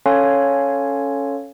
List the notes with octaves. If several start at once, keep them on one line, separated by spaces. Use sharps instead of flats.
C#4 A4 C#5 F5 G#5 C6